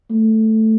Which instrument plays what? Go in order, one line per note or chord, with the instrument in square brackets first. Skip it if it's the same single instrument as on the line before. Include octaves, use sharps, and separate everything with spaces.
[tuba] A3